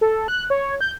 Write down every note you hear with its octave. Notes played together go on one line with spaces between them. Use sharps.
A4
F#6
C#5
G6